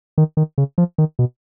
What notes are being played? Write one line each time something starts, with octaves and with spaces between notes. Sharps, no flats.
D#3
D#3
C#3
F3
D#3
B2